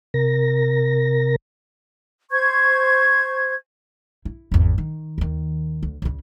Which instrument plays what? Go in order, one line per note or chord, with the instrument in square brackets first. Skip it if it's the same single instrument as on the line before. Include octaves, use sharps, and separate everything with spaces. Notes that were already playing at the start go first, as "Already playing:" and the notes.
[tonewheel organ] C3 A#4 A#6
[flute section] C5 C#6 G6 G#6
[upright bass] E4
G#1 E2
D#3
D#2 D#3
D2
C#2 C#3